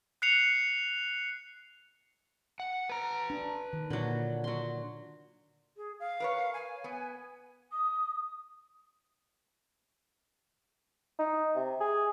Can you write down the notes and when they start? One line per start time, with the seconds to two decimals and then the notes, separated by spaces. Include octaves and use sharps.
0.22 F#6 C7 C#7 F7
2.60 F#5
2.90 B4 A#5
3.30 D4
3.73 D#3
3.90 A#2 D3 F#3
4.44 F#3 C6
5.77 G#4
5.99 F5
6.20 A#4 B4 C#5
6.53 G#5
6.84 B3
7.71 D#6
11.19 D#4
11.55 C3
11.80 G#4